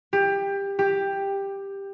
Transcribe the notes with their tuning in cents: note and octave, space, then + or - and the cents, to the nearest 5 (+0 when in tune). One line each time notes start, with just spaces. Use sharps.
G4 +20
G4 +10